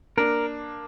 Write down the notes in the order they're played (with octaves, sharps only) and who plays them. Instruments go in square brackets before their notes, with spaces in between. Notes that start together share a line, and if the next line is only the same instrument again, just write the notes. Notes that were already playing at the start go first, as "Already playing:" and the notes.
[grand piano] A#3 D4 [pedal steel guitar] A#4